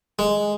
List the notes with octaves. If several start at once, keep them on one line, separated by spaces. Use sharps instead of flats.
G#3